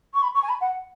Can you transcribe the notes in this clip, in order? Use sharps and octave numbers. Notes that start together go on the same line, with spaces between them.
C#6
B5
C#6
G#5
B5
F#5